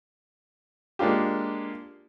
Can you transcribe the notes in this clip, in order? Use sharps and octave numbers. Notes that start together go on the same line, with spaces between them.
G#3 A#3 D4 F4 G4